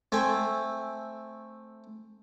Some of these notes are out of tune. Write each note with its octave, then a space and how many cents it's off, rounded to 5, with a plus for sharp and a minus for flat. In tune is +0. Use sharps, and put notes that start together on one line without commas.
A3 +0 C4 +5 G#5 +0